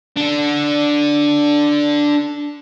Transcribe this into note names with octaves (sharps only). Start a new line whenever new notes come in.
D4 A4